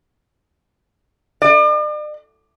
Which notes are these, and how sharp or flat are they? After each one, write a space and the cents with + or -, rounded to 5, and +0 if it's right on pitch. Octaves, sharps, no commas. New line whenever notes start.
D5 +40